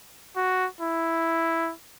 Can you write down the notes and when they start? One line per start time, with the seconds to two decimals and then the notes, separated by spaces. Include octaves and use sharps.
0.36 F#4
0.81 E4